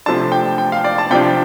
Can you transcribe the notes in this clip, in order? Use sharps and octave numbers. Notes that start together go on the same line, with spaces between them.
C3 F3 A3 D4 A5
G5
G5
F5
D5
A5
C3 F3 D4 G5